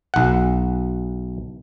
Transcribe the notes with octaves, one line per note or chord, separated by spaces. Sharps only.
B1 F#5